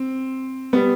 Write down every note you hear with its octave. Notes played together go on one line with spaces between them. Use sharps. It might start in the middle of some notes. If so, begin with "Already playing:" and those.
Already playing: C4
G3 B3